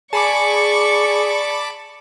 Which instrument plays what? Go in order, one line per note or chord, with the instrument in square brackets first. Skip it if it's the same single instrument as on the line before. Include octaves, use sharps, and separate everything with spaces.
[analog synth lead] G#4 [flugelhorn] D5 [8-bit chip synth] A5 B5 D6 [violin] C#6 C#7